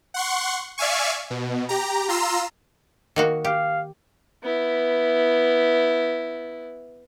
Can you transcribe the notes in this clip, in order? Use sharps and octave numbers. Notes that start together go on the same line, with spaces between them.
F#5 C6 C#6
D5 E5 F5 G#5 C#6
B2
G4 A#5
F4 A#5 C6 E6
D#3 A#3 F#4
G4 F5
B3 E4